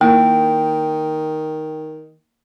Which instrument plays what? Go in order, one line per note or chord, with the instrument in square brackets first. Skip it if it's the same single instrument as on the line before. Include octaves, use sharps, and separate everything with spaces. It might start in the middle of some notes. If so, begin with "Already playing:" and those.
[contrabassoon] D#3 [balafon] A#3 E4 A#4 [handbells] G5